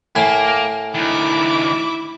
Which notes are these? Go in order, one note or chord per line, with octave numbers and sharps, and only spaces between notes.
A2 A#3 G#5
D2 D#3 E4 D6